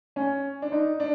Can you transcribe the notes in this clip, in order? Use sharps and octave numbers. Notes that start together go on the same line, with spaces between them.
C#4
D4
D#4
D4